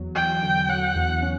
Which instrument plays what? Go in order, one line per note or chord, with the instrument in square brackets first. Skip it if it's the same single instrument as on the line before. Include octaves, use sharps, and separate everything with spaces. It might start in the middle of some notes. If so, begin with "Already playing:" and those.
Already playing: [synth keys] E2 F#3
[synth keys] E2 [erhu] G5
[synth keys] D3
[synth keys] F#3 [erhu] F#5
[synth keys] E2
C#4